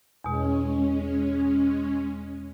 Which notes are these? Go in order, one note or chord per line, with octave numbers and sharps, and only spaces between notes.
E2 B2 G#3 C#4